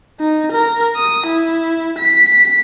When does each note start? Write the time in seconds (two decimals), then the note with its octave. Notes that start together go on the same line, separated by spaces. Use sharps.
0.20 D#4
0.52 A#4
0.96 D#6
1.26 E4
1.98 B6